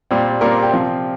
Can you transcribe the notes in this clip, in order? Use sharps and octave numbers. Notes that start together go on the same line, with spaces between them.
A#2 G3 C4
A#2 G3 C4 A#4
G4
C3 F3 C4